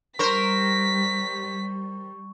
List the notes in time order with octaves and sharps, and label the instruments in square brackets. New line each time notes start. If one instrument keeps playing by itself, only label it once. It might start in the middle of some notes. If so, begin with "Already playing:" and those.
[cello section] G3 [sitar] A#4 C5 [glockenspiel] C#6 [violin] B6